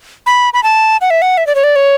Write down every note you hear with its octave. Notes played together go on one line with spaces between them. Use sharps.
B5
B5
A5
F#5
E5
F#5
E5
D5
C#5
D5
C#5